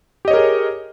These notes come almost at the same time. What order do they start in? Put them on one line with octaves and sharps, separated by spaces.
G4 D#5 C#5 A#4 G#4